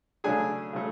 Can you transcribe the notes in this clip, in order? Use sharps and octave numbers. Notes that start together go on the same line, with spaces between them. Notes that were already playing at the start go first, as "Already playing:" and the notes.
C#3 F#3 A3 D4 G#4 G#5
C#3 F#3 A3